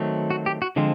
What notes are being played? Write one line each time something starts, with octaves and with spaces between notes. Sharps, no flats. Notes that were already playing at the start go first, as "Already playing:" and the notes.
Already playing: D#3 F#3 A3 C4
F#4
G4
F#4
D3 F3 G#3 C4